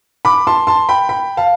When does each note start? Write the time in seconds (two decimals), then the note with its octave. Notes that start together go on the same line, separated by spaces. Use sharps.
0.25 B5 D6
0.47 A5 C6
0.67 A5 C6
0.89 G5 B5
1.09 G5 B5
1.37 F5 A5